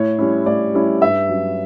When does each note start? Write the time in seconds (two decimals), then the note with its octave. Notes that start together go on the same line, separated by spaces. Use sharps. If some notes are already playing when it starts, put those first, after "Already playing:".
Already playing: A2 C#5
0.19 G3 C#4 E4
0.46 A2 D5
0.74 G3 C#4 E4
1.02 G2 E5
1.29 F#3 C#4